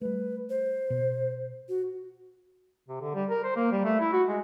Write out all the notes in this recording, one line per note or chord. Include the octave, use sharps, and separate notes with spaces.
G3 A3 B4
C5
B2
F#4
C3
D3
G3
A#4
C5
A#3
G3
A3
E4
F#4
G#3